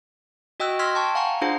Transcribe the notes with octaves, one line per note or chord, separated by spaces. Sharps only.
F#4 D#5 G5 E6 F#6
C6 E6 F6 G#6 A#6 B6
G5 A5 C#6
F5 F#5 G#5 A#5 C#6
D4 F4 G#4 C5 F#5 A#5